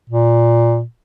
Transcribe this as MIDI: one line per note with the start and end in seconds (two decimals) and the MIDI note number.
0.10 0.83 46